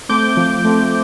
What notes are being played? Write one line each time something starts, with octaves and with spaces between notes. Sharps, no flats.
A3 C4 D6 G6
F3
A3 C4